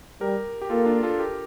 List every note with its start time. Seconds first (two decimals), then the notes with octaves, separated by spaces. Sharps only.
0.21 G3 G4 A#4
0.62 G4
0.70 A#3 F4 A4
0.86 D4 F4
1.03 F4 A4
1.18 G4 A#4